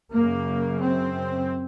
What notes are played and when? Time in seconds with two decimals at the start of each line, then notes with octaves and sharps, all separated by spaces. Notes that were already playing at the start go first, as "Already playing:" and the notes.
0.13 F#2 C#3 A#3
0.81 C4